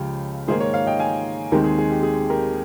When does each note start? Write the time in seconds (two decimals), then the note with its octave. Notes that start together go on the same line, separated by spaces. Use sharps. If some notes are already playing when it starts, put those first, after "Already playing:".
Already playing: C#2 C#3 F3 G4
0.47 G#2 D#3 A#3 G#4 C5
0.60 A#4 C#5
0.74 C#5 F5
0.87 D#5 G5
0.99 F5 G#5
1.52 D#2 D#3 G#3 C4 G4 A#4
1.64 G#4
1.78 G#4
1.90 G4
2.03 G#4
2.30 G4 A#4